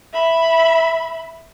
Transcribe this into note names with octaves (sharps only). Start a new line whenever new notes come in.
E5 B5